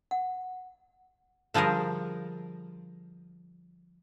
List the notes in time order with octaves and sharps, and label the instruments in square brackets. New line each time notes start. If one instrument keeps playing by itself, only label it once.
[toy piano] F#5
[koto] D3 F3 G3 G#4 A#4